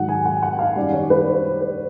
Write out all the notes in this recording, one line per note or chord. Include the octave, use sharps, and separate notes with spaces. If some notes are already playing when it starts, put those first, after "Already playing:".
Already playing: G#2 D#3 F#3 F#5
G#5
F#5
F#5
F5
F#2 D#3 G3 D5
C#5
B4
C5
B4